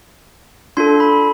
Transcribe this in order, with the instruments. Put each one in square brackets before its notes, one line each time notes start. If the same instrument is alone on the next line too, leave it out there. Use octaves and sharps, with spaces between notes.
[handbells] D4 F4 A4 C6
B5